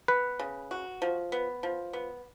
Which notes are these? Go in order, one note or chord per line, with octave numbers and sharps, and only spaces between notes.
B3 B4
C#3
F#4
F3
B3
F3
B3